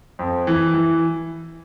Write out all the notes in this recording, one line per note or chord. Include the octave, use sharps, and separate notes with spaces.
F2
E3
E3